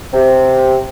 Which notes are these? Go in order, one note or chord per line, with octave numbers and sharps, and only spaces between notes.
C3